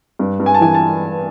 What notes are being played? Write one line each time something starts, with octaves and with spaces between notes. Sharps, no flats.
G2
G2
G#5
A5
E3 G#5
A5